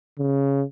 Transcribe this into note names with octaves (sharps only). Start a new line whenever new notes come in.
C#3